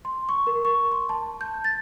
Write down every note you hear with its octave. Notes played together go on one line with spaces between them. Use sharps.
C6
C#6
A#4
C#6
C6
A5
G6
A6